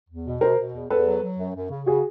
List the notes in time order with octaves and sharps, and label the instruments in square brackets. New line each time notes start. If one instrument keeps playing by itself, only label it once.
[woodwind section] E2
B2
[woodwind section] B2 [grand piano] A#4 C5
[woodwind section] B2
E2
[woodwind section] E2 [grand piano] A4 B4
[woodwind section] F#3
F#3
F#2
F#2
C#3
[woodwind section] C#3 [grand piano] F#4 G#4